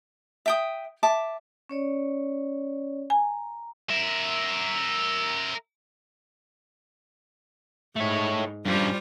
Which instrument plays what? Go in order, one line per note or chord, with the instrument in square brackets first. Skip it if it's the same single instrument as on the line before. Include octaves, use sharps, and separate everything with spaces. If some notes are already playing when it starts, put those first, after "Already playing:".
[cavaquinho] E5 G5 D#6
E5 A5 D6
[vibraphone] C#4 C#5 D5
[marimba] G#5 [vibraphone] A#5
[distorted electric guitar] A#4 E5
[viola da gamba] G#2 [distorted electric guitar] A3 C#5
[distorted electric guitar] G2 C#4 [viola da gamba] G3 F4 C5